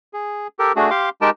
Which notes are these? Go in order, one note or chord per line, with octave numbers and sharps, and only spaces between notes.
G#4
G4 A4 A#4
A3 D4 F#4 G#4
G4 F5 C6 D6
G#3 D#4 G4 A#4 G5 A5